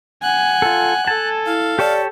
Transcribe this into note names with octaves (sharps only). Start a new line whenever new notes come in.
F#5 G#5 F#6
F4 A4
A4 G#5 A5
E4 F5
G4 C#5 D5 A5